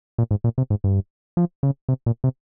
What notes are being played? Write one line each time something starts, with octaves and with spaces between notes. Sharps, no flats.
A#2
G#2
A#2
C3
G#2
G2
F3
C#3
C3
A#2
C3